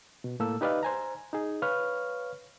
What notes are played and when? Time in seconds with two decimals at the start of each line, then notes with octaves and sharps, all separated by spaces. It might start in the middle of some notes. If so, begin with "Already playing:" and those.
0.24 B2
0.40 A2 A#3 A4 E6
0.61 D#4 G4 B4 D5 D#5 F5
0.83 C5 G#5 A#5
1.33 D#4 G#4
1.62 B4 C#5 F5 C#6 F6